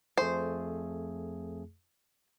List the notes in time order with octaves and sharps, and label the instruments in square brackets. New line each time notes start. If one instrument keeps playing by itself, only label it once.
[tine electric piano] F2 A3 G#4 [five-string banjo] C5